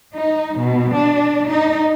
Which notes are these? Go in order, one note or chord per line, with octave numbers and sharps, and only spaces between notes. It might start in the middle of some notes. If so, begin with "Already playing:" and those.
D#4
B2
D4
D#4